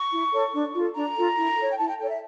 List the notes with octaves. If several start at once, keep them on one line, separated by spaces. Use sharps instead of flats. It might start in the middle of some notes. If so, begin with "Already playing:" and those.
Already playing: C#6
E4
A4 C#5
D4
F4 A4
D4 A#5
F4 A4
E4
A4 C#5
G5
E4 A5
G5
A4 C#5 G5
E5